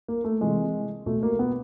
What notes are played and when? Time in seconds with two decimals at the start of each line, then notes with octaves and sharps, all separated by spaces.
0.08 A#3
0.24 A3
0.41 C3 E3 G#3
1.06 B2 A3
1.23 A#3
1.39 B3